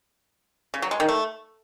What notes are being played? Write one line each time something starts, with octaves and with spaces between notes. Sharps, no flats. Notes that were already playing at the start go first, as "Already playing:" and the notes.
C#3
F#3
G#3
D#3
A3